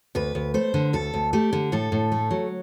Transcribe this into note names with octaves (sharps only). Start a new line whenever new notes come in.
D2 B4
D2
A3 C5
D3
D2 A4
D2
A3 G4
D3
A2 A4
A2
A3
F#3